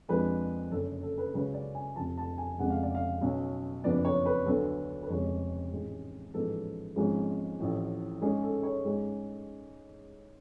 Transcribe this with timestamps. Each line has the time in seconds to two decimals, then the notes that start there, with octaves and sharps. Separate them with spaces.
0.09 F2 F3 G#3 D4 B4
0.71 F#1 F#2 D3 A4
1.03 A4
1.18 B4
1.33 C#2 C#3 F#3 C#4 B4
1.54 D5
1.75 G#5
1.96 F1 F2 F3 A5
2.18 A5
2.38 G#5
2.58 F1 F2 C#3 G#3 F#5
2.70 F5
2.83 D5
2.95 F5
3.21 B1 B2 F#3 C#4
3.84 F#1 F2 F3 B3 D4 D5
4.05 C#5
4.26 B4
4.46 D2 D3 F#3 B3 D4 A4
5.03 B4
5.09 F1 F2 C#3 G#3 C#5
5.71 A1 G#2 G#3
6.34 A1 G#2 F3 B3 A4
6.96 G#1 G#2 F3 G#3 C#4
7.59 A1 A2 F3
8.21 G#2 G#3 C#4 G#4
8.43 A4
8.63 C#5
8.85 G#2 G#3 C#4